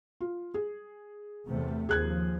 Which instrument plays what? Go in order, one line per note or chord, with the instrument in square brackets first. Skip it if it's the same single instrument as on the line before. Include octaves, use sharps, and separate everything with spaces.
[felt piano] F4
G#4
[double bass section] E2 C3 A3
[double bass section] D#2 F3 [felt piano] G#4 F#6 G#6